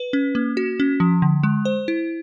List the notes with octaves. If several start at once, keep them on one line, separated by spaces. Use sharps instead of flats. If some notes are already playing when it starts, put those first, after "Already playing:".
Already playing: B4
C#4
A#3
F#4
C#4
F3
D3
G#3
C5
E4